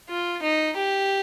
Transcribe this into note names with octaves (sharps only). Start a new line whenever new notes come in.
F4
D#4
G4